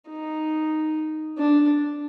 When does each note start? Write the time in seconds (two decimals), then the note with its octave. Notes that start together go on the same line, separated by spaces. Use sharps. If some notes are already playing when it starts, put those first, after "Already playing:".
0.09 D#4
1.38 D4